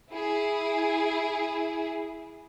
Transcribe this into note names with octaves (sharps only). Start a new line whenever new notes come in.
E4 G#4